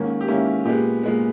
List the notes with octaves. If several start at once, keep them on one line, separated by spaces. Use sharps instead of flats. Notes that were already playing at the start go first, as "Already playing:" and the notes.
Already playing: G#2 D#3 A#3 C#4
G4
G#2 D#3 A#3 C#4 E4
A#2 G#3 B3 G4
A#2 G#3 B3